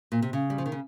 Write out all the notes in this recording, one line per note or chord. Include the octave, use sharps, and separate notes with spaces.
A#2
C3
C#3
G3
F3
D#3
C#3